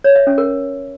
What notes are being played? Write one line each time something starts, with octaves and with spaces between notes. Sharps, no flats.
C#5
E5
C#4
A#4